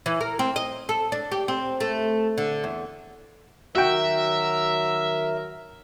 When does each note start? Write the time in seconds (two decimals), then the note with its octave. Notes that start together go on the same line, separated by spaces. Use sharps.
0.06 E3
0.21 A#4
0.39 C4
0.56 D#5
0.89 A4
1.12 D4
1.32 G4
1.48 C4
1.80 A3
2.38 D3
2.64 E2
3.76 D#3 F#3 F#4 A#4 E5 G5